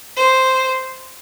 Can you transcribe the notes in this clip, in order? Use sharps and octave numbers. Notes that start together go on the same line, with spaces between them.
C5